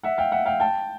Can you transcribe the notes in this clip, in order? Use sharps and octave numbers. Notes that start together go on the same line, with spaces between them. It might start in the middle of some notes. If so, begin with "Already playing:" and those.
E5 F#5
F5 G5
E5 F#5
F5 G5
G5 A5